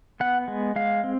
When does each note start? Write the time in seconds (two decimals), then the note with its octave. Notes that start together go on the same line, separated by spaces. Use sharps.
0.20 B3 F#5
0.48 G#3
0.76 G#3 F5
1.04 C4